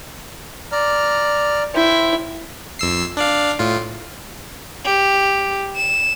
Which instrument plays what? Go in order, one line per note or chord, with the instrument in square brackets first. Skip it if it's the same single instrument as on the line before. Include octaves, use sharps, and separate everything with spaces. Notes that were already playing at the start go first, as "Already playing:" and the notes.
[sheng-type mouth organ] D5 A#5 F6
[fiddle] E4 [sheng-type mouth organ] C5 G5
[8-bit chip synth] F2 E6 C7
D4 D5 F5
A2 F4
[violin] G4
E7